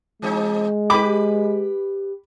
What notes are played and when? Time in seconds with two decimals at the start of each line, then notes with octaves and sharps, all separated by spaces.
0.22 E3 G#3 C4 D#4
0.90 G4 B4 B5 D6